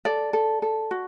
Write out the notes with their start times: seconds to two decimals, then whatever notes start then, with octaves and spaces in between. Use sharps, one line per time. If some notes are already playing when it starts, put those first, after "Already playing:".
0.05 A4 D5
0.33 A4
0.62 A4
0.91 F#4